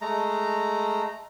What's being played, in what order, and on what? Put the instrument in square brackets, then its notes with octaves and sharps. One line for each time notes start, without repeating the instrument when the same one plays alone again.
[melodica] G#3 A3 A#5